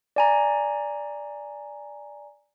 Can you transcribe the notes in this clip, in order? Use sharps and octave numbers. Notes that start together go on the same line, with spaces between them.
D5 G#5 A#5